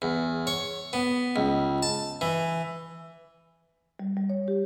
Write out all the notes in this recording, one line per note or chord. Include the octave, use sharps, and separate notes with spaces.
E2
C#5
B3
C#2
A5
E3
G3
G3
C#5
G4